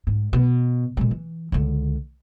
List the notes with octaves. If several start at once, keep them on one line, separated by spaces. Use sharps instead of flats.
G#2
B2
A#2 G#3
E3
C#2 D3